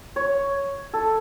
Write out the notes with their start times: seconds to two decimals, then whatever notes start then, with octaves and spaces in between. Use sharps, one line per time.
0.16 C#5
0.94 A4